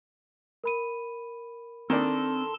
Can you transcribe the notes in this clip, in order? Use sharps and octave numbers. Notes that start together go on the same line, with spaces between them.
A#4 B5 D#7
D#3 C4 D4 A4 A5 C6